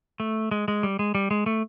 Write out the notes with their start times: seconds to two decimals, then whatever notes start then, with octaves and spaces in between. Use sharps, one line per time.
0.20 A3
0.51 G#3
0.68 G#3
0.83 G3
0.99 G#3
1.15 G3
1.31 G#3
1.46 A3